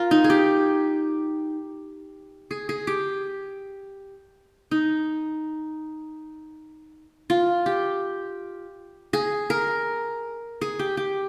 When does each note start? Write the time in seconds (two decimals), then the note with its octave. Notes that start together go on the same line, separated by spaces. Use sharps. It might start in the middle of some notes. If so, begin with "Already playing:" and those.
Already playing: F4 A#4
0.11 D#4
0.24 G#4
0.30 G4
2.51 G#4
2.69 G#4
2.87 G4
4.71 D#4
7.30 F4
7.66 G4
9.13 G#4
9.50 A#4
10.61 G#4
10.79 G4
10.97 G4